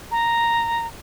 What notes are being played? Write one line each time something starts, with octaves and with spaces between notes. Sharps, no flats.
A#5